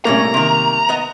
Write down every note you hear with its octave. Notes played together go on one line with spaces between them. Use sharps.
C2 A2 A3 A#3 C#4 A#5
C3 D#3
B3 D#5